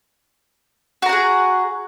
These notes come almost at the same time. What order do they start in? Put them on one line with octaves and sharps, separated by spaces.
F#4 A#5 F#5 G#4